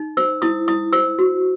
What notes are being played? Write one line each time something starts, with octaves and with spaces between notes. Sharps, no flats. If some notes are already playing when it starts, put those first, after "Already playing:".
Already playing: D#4
C5 E6
E4 D#6
E4 D#6
C5 E6
F#4